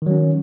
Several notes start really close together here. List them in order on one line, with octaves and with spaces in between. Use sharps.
D#3 F#3 C#4